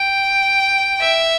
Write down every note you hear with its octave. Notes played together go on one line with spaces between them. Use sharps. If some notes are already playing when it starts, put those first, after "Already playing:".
Already playing: G5
E5